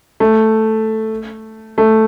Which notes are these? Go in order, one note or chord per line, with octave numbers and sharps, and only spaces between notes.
A3
A3